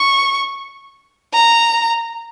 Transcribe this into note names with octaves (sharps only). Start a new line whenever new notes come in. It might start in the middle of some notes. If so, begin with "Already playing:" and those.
Already playing: C#6
A#5